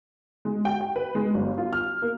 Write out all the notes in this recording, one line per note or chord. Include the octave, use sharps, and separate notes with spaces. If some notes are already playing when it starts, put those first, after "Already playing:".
G#3
G5
G5
B4
G#3
G1
F4
F6
A#3